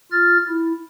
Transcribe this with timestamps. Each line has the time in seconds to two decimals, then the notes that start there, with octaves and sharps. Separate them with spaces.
0.12 F4 F6 A6
0.48 E4